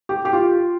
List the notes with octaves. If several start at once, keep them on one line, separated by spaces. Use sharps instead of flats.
G4
G4
F4